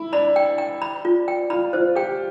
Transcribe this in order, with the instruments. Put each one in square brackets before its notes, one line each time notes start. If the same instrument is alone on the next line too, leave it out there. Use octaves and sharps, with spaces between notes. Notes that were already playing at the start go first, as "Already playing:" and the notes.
Already playing: [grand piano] E4
[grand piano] D4 [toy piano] B5
[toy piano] G5
G5
B5
F4
G5
[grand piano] F4 [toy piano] B5
[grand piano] F4 [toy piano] C5
[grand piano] G4 [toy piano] G5